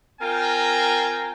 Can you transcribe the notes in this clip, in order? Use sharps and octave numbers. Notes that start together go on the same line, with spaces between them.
C4 F4 A#4 G5 G#5 A#5